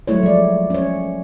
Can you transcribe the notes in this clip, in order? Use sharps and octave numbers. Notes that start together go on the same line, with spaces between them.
F#3 G#3 A3 E4 C#5
F3 D5
C#4 C#5